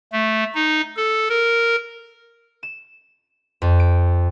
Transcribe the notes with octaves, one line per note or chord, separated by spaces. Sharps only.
A3
D#4
A4
A#4
E7
F2
D7